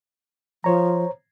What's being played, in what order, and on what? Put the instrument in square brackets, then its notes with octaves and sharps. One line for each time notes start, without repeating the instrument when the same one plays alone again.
[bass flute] F3 [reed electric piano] C5 C#5 A#5